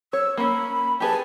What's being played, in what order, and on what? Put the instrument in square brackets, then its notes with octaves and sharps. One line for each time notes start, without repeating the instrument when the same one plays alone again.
[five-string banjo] C#5 [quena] E6
[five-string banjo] A#3 C#4 [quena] B5
[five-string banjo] G4 G#4 B4 [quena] A5